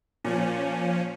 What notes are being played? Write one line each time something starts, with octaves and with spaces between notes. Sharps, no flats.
A#2 F3 C#4